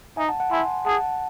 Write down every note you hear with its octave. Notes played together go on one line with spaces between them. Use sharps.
D#4 E5 G#5
F#5 A5
F#5 A5
E4 G#5 C6
G#4 F#5 A5